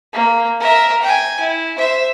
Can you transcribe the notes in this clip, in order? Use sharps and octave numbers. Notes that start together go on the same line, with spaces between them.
A#3
A#4 E5
G5 G#5
E4
C5 E5